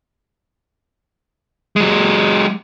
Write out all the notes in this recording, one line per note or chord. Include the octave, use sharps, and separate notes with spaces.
F#3 G#3